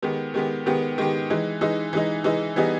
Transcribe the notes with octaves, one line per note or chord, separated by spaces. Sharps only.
D#3 G#3 B3 G4
D#3 G#3 B3 G4
D#3 G#3 B3 G4
D#3 G#3 B3 G4
E3 G#3 D#4
E3 G#3 D#4
E3 G#3 D#4
E3 G#3 D#4
E3 G3 B3 D#4 G#4